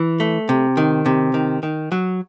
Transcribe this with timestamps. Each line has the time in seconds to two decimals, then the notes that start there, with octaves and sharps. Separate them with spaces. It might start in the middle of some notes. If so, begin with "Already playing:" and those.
Already playing: E3
0.20 A3
0.49 C3
0.77 D#3
1.06 C3
1.34 D#3
1.63 D#3
1.92 F#3